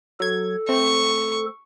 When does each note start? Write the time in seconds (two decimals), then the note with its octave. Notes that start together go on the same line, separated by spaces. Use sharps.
0.20 F#3 A4 G#6
0.69 A3 C4 C#6